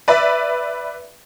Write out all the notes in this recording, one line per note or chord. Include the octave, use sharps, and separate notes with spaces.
B4 D5 E5